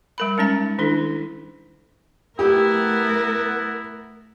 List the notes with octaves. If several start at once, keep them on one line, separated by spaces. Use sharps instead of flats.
G3 A#4 B5
G#3 C#4 D#4 A#5
D#3 D4 E4 A4
A3 B3 E4 G4 A#4